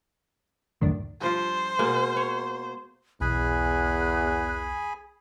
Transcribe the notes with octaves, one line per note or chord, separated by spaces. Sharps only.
C#2 F#2 A2 D#3 D4
G2 F3 F4 C5
B2 G#3 A#3
C#5
B1 E2 G#4 G#5 B5 F#6